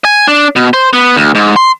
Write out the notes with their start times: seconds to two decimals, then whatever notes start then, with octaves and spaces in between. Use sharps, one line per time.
0.05 G#5
0.27 D4
0.56 B2
0.73 C5
0.93 B3
1.16 D2
1.35 G#2
1.56 C6